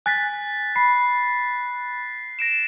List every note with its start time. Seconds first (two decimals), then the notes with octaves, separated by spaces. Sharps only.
0.06 G#5 F#6 A6 B6
0.76 B5 C7
2.39 A#6 D7 E7